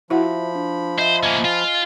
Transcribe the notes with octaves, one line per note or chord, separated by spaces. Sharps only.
F3 E4 F#4 C5 E5 F#5 B5
D4
C5 D#5 E5
A#3 C#4 D#5 G#5
F4